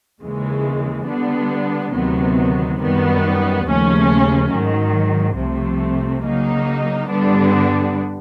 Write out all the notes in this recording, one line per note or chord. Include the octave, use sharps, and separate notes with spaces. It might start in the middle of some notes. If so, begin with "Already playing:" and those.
D#2 C#3 E3 G#3
D3 G3 B3 D4
D2 C3 D#3 F#3 B3
F#2 D#3 G3 B3
D#2 C#3 F3 A3 C#4
G#2 D#3 F#3
C2 C3 F3 A3
C#3 F#3 A#3 D#4
G2 D3 G3 B3 D4